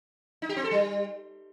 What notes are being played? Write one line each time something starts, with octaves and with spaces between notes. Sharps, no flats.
D#4
G4
C4
A4
G3